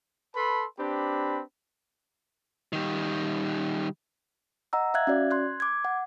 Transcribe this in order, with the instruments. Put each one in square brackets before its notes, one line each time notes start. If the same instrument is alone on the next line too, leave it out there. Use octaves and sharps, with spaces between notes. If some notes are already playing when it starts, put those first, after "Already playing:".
[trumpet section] A4 B4 A5 B5 C6
C4 D4 G4 B4 B5
[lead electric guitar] D#3 G3
[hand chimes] D#5 F#5 A#5 E6
E5 F5 F#6 G#6
C#4 F#4 D5
C6 F#6 G#6
D6 G#6
F#5